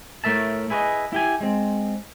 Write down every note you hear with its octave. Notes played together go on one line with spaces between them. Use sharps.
A2 A3 A#4 E5 A5
E4 G#4 B4 C#5 D#5
E4 G4 G#5
G#3 C4